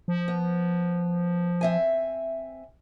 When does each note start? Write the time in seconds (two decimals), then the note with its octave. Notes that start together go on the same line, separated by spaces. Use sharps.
0.08 F3
0.28 B3
1.61 C4 E5 G#5